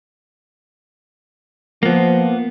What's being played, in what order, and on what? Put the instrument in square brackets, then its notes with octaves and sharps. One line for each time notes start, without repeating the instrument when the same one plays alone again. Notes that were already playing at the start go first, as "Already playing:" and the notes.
[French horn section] F3 [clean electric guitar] A#3 B3